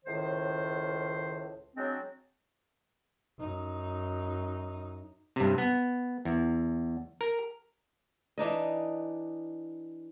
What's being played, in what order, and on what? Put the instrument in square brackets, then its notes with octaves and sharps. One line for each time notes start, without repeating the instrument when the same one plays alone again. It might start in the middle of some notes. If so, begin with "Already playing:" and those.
[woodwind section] C#2 A2 D#3 C5
F#3 G#3 C4 D4
[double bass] F#2 D#4
[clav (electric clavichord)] G2 C3
B3
E2
A#4
[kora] E3 D4 D#4 D#5